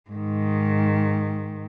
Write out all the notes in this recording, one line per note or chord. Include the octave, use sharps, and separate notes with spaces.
G#2 D#3